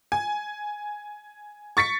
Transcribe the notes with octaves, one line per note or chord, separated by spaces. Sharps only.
G#5
C#6 A6 B6 C#7